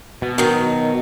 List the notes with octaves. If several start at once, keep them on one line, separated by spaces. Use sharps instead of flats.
B2
D#3 F#3